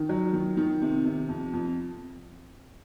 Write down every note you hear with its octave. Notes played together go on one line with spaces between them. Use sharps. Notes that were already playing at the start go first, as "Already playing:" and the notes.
Already playing: D#3
F#3
D#3
D#3
C3
C3
F2
F2